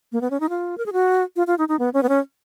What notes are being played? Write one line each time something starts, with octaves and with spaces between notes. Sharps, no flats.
A#3
B3
C#4
D#4
F4
A#4
G#4
F#4
F4
F4
D#4
D#4
B3
C#4
B3
C#4